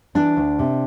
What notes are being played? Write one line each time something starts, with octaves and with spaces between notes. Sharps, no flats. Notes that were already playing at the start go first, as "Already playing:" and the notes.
E3 D4
D2
C3